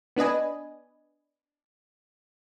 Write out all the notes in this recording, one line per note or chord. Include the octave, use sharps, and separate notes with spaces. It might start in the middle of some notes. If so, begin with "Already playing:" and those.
B3 D4 B4 D#5 G#5